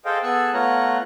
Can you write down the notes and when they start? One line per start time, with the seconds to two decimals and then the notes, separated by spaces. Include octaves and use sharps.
0.05 G#4 A4 C5 D#5 F5 G5
0.23 B3 G#4 A4 G#5 E6 F#6
0.54 A3 B3 F4 C#5 A#5 F#6